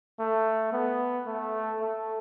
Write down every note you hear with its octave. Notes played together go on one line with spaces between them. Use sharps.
A3
B3
A3
A3